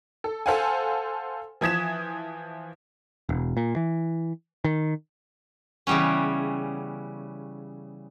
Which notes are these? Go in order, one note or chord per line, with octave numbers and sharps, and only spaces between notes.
A4
A4 C5 F5 F#5 G#5
E3 F3 D#6 G#6 B6 E7
E1
A#2
E3
D#3
C#3 E3 G3 B3 C#4